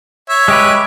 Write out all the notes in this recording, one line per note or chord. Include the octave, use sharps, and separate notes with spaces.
C#5 E5
G#3 G4 B4